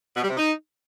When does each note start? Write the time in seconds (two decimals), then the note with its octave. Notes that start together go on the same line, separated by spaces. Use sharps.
0.16 B2
0.23 G3
0.30 C3
0.37 D#4